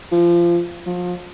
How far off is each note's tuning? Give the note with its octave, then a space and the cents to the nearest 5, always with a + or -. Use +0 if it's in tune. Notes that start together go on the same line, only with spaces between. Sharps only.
F3 -25
F3 +30